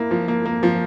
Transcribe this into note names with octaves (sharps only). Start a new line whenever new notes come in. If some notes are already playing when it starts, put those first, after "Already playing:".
Already playing: A#3 E4
F3
A#3
A#3
F3